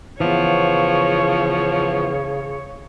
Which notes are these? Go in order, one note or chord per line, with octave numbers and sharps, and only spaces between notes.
C#3 E3 F3 B3 C#5